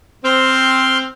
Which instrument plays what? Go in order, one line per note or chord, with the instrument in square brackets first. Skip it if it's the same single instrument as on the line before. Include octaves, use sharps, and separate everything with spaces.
[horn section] C4 [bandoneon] C6 F6 G6